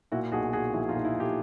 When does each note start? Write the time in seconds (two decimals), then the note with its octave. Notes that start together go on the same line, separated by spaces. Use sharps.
0.12 A#2 E4 F#4
0.32 B1 F#4 G#4
0.53 B1 F#4 G#4
0.73 F3 E4 F#4
0.89 D#4 F4
0.95 A#2
1.05 E4
1.16 B1 G4 A4